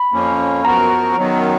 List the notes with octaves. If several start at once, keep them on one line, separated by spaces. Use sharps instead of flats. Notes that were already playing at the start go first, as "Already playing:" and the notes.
Already playing: B5
F2 F3 A#3 C#4
F#2 F3 B3 F#4 A#4 A#5
F#2 D#3 F#3 B3